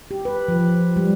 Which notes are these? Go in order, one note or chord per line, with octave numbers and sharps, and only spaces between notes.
G4
B4
F3
G3